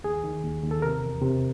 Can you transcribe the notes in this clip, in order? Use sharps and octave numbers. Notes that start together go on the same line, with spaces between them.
D#2 G#4
D#3
D#2
D#2
A4
C3 A#4
E2
C3